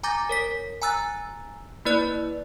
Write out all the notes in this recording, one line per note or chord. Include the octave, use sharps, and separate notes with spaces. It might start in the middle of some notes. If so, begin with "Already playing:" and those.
G#5 A#5 D6 G6 A6 A#6
A#4 C#5 B6
G#5 A#5 E6 F#6 A6
A#3 E4 B4 D5 F#6